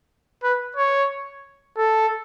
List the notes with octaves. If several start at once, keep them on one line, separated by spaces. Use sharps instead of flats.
B4
C#5
A4